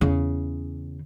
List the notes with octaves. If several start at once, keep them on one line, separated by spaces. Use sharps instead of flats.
E2 C#3